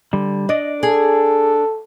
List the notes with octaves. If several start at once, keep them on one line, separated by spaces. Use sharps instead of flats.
D3 G3
D4 D5 D#5
G#4 A4